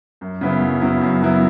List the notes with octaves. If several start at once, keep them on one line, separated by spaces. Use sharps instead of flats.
F#2
C#3 F#3 B3 E4
F#2
C#3 F#3 B3 E4
F#2
C#3 F#3 B3 E4